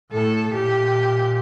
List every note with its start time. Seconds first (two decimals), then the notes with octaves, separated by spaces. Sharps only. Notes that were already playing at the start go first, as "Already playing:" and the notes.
0.13 A2 A4
0.54 A#2 G4